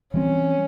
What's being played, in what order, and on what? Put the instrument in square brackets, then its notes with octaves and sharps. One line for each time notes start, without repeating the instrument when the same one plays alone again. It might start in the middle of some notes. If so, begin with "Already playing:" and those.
[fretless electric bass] E3 G3 C4 [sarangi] C#4